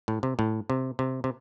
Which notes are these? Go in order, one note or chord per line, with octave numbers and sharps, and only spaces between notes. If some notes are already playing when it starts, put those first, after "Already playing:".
A2
C3
A2
C3
C3
C3